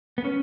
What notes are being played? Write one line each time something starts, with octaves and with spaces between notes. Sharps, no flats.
B3
C#4